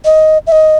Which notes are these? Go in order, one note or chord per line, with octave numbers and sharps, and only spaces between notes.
D#5
E5
D#5